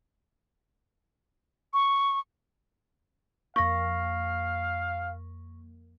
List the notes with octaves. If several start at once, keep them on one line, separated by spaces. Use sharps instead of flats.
C#6
F2 A#3 F5 C#6 A#6